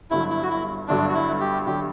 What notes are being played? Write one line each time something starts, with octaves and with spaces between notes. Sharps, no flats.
G1 G2 D3 F#3 E4
E4
F#4
E4
G1 G2 D3 F#3 D4
F#4
E4
G4
D3 F#3 G4